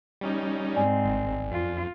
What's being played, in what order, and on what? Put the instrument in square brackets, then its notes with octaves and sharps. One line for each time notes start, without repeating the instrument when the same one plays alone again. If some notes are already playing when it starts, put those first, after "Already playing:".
[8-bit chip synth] G3 C#4 D#4
[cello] G#2 C4 [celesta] D5 G#5
[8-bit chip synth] G#1
[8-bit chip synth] F2 [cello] F4